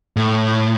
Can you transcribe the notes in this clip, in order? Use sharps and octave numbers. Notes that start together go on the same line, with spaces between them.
A2